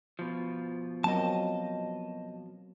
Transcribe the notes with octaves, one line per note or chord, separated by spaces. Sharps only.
B2 F3
F#3 A#3 C4 D#5 A5